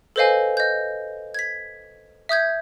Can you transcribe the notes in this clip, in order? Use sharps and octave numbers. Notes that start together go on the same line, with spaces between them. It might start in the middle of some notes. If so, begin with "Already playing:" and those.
A4 B4 C5 D#5 F5 G#5
D#5 G6
G#6 B6
E5 D#6 G6 G#6